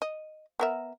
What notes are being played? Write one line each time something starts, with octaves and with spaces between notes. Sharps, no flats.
D#5
B3 A#4 E5